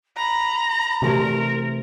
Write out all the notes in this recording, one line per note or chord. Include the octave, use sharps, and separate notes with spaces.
A#5 B5
C3 E3 A3 F#4 G4 A#4 D5